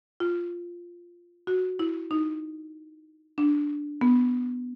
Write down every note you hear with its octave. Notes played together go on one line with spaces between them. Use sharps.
F4
F#4
E4
D#4
D4
B3